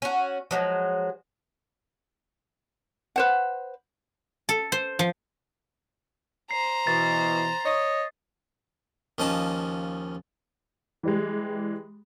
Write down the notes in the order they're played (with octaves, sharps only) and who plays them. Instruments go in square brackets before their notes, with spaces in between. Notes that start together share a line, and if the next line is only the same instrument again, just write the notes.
[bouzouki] C#4 F#4
F3 F#3 G#3
[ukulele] B4 C5 F#5
[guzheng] A4
C5
F3
[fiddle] C5 A#5 [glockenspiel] C7
[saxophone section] B2 E3 [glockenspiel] A6
[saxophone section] C#5 D#5
[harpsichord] D#2 F3 C#4 D#5 A5
[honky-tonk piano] E3 G3 G#3